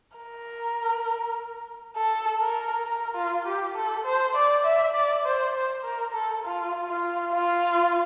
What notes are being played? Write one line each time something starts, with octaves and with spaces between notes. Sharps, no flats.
A#4
A4
A#4
A#4
F4
G4
A4
C5
D5
E5
D5
C5
C5
A#4
A4
F4
F4
F4